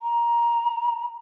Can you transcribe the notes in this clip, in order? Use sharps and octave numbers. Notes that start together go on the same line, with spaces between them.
A#5